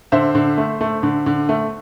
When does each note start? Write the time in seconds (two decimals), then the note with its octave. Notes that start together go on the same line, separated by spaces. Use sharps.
0.12 D3 C5 E5
0.35 D3
0.58 A3
0.81 A3
1.03 D3
1.26 D3
1.49 A3